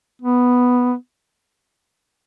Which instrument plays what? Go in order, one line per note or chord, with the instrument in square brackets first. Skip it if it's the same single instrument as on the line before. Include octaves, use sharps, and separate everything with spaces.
[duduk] B3